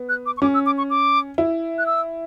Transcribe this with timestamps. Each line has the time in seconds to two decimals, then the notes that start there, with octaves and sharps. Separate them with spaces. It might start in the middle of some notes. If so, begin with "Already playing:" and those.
Already playing: B3
0.09 F#6
0.26 D6
0.37 C#6
0.42 C#4 D6
0.54 E6
0.66 D6
0.78 C#6
0.90 D6
1.38 E4
1.78 F#6
1.86 E6